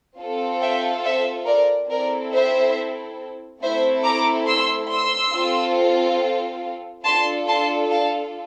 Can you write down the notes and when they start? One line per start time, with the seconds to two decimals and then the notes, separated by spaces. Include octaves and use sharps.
0.19 C4 F4 A4
0.61 E5 G5
1.04 C5 E5
1.47 A#4 D5
1.90 C4 E4 A4 A#4 D5
2.33 C5 E5
3.62 A3 C4 E4 A4 C5 E5
4.05 A#5 D6
4.48 C6 E6
4.90 C6 E6
5.34 C4 F4 A4
7.05 D4 F4 A4 A5 C6
7.48 A5 C6
7.91 F5 A5